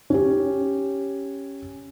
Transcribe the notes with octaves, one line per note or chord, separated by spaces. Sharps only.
C#4 G4